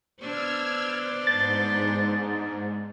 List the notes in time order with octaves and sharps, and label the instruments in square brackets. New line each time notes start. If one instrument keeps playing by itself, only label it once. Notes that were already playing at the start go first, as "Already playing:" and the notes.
[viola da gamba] B3 D4 C5 [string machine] E6 F6 G#6
[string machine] G#2 [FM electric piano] A6